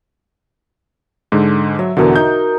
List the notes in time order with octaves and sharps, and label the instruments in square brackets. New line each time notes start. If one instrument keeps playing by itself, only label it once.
[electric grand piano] G#2 D3 G#3
[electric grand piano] F#3 [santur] E5
[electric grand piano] E2 B2 D3 [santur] F#4 A#4 D5
[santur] D#4 [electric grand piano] G6